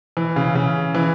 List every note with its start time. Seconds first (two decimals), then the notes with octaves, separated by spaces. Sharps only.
0.17 E3
0.36 C#3
0.55 C#3
0.95 E3